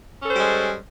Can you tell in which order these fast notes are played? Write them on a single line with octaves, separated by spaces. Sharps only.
C#4 A4 C5 G3 G#3